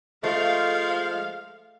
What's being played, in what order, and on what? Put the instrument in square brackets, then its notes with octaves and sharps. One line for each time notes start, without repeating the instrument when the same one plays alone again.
[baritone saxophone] F3 [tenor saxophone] G#3 [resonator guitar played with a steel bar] A3 [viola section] F5